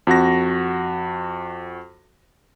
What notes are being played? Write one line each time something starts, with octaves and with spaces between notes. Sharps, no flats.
F2 F#4 F#5 A#6